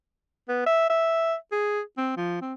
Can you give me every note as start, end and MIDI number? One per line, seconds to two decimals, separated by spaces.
0.48 0.61 59
0.66 0.88 76
0.89 1.35 76
1.52 1.81 68
1.97 2.16 60
2.17 2.40 53
2.41 2.54 60